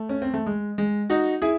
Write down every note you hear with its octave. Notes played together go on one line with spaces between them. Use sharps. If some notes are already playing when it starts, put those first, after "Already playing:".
Already playing: A3
C#4
C4
A3
G#3
G#3
D#4 F#4
E4 G#4